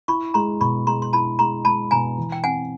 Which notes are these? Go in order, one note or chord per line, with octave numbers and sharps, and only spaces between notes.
E4 B5 C#6
G#3 A#5 C6
B2 B5 C#6
G#3 A#5 C6
C6
E4 A5 B5
G#3 A#5 C6
G#3 A5 B5
B2 G#5 A#5
E3
G5
C4 F#5 G#5